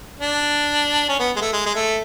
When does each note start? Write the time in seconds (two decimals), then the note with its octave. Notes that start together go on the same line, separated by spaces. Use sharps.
0.19 D4
1.09 C#4
1.19 B3
1.36 G#3
1.41 A3
1.53 G#3
1.66 G#3
1.75 A3